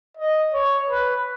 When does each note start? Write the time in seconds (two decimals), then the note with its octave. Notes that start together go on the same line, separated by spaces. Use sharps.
0.17 D#5
0.53 C#5
0.90 B4